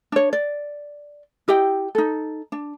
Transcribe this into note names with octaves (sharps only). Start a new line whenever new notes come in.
D4 C#5
D5
E4 G4 D#5 G5
D#4 A4
D4